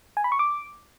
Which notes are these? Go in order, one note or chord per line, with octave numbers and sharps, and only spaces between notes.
G#5
B5
C#6
D6